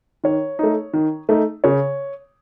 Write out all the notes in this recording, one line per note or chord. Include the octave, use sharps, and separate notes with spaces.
D#3 C#5
A3 D#4
D#3
A3 D#4
C#3 C#5